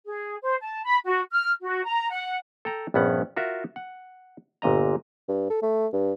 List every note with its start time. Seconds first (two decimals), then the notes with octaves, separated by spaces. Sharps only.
0.05 G#4
0.42 C5
0.61 A5
0.83 B5
1.04 F#4
1.30 F6
1.62 F#4
1.84 A#5
2.10 F#5
2.65 A4 G5 A#5
2.94 A#1 G2 B3 C#4 F#5
3.36 F4 F#4 A#4 E5
3.76 F#5
4.62 G1 A#2 D#5 A#5
5.29 G2
5.50 A4
5.62 A3
5.93 G2